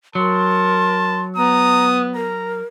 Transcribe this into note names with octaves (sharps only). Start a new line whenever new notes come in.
F#3 A#4 A5 C6
B3 A#5 D#6
A#4 A#5